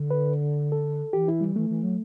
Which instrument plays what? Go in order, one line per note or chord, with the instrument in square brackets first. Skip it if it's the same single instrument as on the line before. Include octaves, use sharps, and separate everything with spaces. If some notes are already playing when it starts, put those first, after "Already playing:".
Already playing: [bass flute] D3
[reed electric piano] B4
A4
[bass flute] E3 [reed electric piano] G4
[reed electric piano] E4
G3
[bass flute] E3 [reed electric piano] A3
[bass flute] E3
F#3